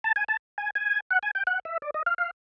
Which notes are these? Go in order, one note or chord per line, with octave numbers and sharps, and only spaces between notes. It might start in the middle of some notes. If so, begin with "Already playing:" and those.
A5
G#5
A5
G#5
G#5
F#5
G#5
G5
F#5
E5
D5
D#5
F5
F5